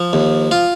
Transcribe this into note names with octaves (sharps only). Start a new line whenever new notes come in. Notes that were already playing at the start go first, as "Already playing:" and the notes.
Already playing: F3
D#2
F4